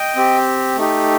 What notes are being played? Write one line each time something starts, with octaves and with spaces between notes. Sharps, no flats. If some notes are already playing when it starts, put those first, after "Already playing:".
Already playing: D#5 G5
C4 G4
A3 D#4 G4